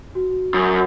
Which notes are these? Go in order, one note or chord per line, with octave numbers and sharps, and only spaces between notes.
F#4
F#2 D#6